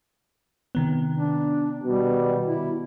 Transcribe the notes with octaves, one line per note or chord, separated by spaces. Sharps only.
C3 D#3 B3
D4
B2 G3
E4